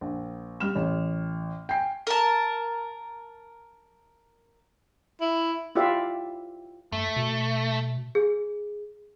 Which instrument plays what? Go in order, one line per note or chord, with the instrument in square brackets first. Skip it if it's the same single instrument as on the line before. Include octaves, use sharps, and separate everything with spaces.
[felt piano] A#1
G3 F6 E7
A1
G5 G#5 C7
[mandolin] A#4 A5
[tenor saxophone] E4
[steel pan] E4 F4 G4 D5 E5 F5
[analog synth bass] G2 [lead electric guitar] A3
[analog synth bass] B2
[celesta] G#4